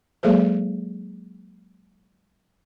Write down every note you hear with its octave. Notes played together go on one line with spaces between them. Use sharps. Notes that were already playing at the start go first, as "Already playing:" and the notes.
F#3 G#3 A#3 G#4 A4 C5